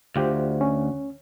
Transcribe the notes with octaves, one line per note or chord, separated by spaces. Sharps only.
D2 F4 G4 C5
C#4